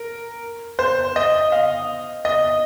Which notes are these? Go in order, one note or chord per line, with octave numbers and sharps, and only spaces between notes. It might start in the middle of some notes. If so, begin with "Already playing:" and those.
Already playing: A#4
C5
D#5
F5
D#5